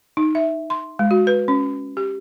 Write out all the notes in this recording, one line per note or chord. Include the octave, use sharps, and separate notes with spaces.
D#4
E5
C6
G#3
F#4
B4
C#4
G4